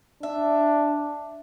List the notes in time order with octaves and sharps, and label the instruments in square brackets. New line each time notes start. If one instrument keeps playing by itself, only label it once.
[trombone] D4 [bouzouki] E5